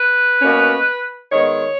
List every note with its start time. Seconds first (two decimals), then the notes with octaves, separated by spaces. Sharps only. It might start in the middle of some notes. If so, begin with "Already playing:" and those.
Already playing: B4
0.42 B2 A#3 C#4
1.32 D#3 G#3 B3 C#5